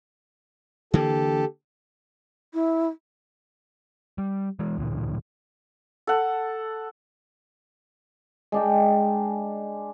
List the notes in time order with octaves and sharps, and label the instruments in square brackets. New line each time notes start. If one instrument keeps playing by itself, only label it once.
[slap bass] D3 E3 A#3 [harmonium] G4 A4
[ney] E4
[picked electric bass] G3
E3 G#3
D1 A#2 D3 E3
[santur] A4 F#5
[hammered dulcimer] G#3 D4 G5